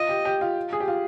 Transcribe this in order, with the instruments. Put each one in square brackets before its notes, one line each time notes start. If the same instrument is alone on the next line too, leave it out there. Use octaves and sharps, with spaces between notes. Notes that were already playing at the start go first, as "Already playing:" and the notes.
Already playing: [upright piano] F4 [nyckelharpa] D#5
[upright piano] G4
G4
F4
G#4
G4
F4